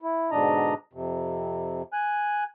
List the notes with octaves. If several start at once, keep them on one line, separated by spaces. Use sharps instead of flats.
E4
G#2 B2 D3 D4 D#5 A#5
F2 C3
G#5 F#6